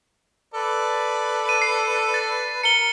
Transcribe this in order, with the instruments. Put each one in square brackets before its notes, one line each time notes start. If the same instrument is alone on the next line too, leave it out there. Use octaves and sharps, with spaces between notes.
[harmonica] A4 B4 D5
[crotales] D#7
C7
A6
[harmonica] A#4 [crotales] C#7 G7